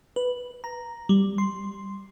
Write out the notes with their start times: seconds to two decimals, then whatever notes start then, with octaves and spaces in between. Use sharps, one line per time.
0.16 B4
0.64 A#5
1.09 G3
1.38 C6